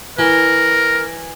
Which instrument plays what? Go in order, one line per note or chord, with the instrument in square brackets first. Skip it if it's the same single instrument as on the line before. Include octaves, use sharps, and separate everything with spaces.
[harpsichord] E3 [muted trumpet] A#4